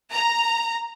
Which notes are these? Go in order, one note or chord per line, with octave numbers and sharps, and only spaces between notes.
A#5